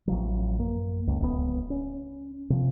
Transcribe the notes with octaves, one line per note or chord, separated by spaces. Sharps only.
A1 F3 F#3
F#2 A#3
C#2
D1 C#2 B2 B3
C#4
C3 F3